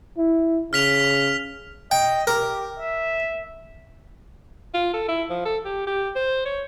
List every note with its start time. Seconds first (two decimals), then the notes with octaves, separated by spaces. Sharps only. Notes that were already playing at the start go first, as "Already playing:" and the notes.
0.17 E4
0.73 C#3 F6 B6 F7
1.91 D#5 G5
2.27 G4 A#4
2.79 E5
4.74 F4
4.93 A4
5.09 E4
5.30 F3
5.45 A4
5.65 G4
5.87 G4
6.16 C5
6.45 C#5